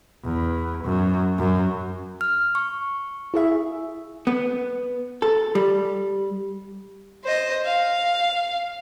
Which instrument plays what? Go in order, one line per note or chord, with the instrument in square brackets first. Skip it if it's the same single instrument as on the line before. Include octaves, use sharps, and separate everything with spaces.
[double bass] E2
F#2
F#2
[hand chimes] F6
C#6
[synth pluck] E4 G#4 E5
[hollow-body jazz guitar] B3
A4
G3
[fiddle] C5 D#5
F5